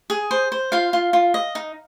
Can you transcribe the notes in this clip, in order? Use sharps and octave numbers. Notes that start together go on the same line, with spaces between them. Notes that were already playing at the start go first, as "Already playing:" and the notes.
G#4
C5
C5
F4 F5
F4
F4
D#5
D#4